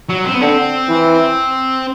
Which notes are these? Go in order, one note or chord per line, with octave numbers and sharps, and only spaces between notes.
F#3
C4
B3
D3 C4
E3